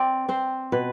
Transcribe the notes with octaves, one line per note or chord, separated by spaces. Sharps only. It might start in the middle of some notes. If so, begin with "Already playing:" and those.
Already playing: C4 D5
C4 C5
B2 B4